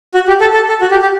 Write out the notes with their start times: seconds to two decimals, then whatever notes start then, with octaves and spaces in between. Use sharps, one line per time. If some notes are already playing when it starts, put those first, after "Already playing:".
0.14 F#4
0.28 G4
0.41 A4
0.54 A4
0.68 A4
0.81 F#4
0.91 G4
1.02 G4